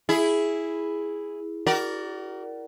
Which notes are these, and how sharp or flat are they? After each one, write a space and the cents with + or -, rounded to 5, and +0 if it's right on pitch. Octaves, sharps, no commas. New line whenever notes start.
E4 +0 G#4 +0
F#4 +35 A#4 +0 D5 +0